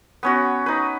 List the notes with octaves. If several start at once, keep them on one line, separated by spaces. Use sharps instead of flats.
B3 C#4 F#4
D#4 B4